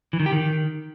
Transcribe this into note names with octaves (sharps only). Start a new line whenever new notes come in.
E3
D#3
G4
D#3